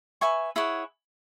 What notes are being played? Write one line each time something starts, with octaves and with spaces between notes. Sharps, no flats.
B4 E5 G#5 C#6
E4 G#4 C#5 F#5